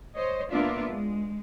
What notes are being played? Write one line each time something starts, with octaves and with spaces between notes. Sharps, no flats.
C5 C#5 D#5
A#3 B3 D4 F4 D5 E5
G#3